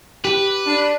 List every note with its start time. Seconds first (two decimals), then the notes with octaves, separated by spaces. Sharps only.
0.25 G4 B4
0.66 D4